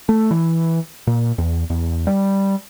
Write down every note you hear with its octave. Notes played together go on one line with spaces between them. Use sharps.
A3
E3
A#2
E2
E2
G3